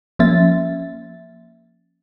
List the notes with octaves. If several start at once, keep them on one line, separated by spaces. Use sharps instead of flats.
F3 A#3 C#4 E5 A6